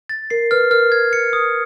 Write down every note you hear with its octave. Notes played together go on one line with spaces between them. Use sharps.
A6
A#4 C7
B4 F6
A#4 F6
G#6
C#7
D#6